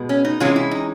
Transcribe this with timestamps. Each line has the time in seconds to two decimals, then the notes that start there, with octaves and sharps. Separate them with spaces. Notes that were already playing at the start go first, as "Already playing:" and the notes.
Already playing: B2 G#3 B3
0.09 C#4
0.25 D#4
0.40 C3 E3 G#3 C#4 F4
0.56 E4
0.71 D#4